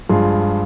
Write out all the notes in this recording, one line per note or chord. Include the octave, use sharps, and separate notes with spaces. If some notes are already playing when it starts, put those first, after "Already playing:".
G2 F3 G#3 F4 G#4